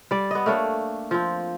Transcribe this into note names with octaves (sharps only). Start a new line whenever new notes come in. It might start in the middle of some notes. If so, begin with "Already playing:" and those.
G3 D5
B3 D#5
A3 A#3 D4 C#5
F3 C4